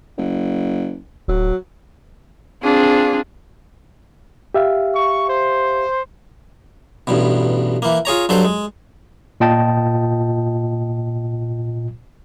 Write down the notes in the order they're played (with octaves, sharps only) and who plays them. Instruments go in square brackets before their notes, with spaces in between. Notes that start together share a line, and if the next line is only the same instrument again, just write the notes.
[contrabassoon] F#1
[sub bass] D1 [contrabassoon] F#3
[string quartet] C4 D4 F4 G#4
[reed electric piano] G4 E5 F5
[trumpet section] C#6
C5
[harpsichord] A1 G2 B2
E3 A#3
F4 G#4 C#5 A#5
G2 F#3 A4 C5
G#3
[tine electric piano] A#2 F4 D#5 G5 A5